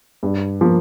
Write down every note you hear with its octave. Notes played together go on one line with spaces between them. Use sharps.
G2
F3 A#3